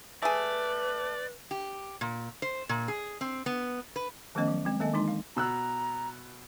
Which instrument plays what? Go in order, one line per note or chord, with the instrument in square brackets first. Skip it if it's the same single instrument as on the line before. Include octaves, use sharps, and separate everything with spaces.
[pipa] A3 G#4 [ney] B4 [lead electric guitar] D5
[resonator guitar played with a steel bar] G4
A#2
C5
A#2
G#4
C4
B3
B4
[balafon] D#3 F3 A3 B3 C#4 D#5
F#3
G#3 C4
D#3 A#3 A4 D#5 G#5
E3 G#3 D4 D#4 C6
F5
[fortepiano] B2 E6 F#6 [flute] A#5